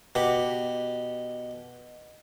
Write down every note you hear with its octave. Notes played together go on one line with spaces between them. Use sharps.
B2 G4